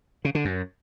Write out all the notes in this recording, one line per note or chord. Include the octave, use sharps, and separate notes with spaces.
C#3
D3
F#2